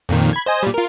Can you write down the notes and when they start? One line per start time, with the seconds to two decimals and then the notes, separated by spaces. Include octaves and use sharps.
0.09 F2 A#2 D#3
0.33 B5 G#6
0.46 C5 D#5 G#5
0.63 A#2 G3
0.74 F4 A#4